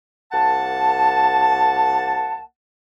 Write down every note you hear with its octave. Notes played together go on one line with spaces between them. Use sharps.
C2 A#3 F#5 A5